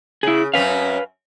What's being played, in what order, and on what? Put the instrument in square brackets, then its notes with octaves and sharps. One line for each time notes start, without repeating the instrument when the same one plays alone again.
[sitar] C#3 [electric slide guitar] E4 G#4
[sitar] F#2 C4 C#4 [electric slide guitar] B4 F5